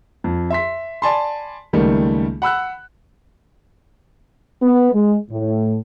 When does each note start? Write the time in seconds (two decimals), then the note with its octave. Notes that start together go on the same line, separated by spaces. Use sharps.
0.24 F2
0.50 E5 C6 B6
1.02 D5 G#5 A5 B5 C6
1.73 C#2 D#3 G3 A3 A#3
2.42 F#5 B5 E6 F#6
4.62 B3
4.93 G#3
5.31 A2